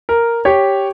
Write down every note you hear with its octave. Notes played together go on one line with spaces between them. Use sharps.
A#4
G4 C#5